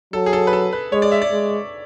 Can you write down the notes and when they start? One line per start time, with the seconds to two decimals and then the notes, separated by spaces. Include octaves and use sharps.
0.13 F#3 A4
0.26 G#4
0.33 A4
0.47 B4
0.53 A4
0.73 B4
0.92 G#3 C#5
1.02 D5
1.12 E5
1.22 D5
1.31 G#3